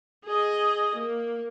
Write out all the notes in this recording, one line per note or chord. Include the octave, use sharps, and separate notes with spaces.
G#4 D#5
A#3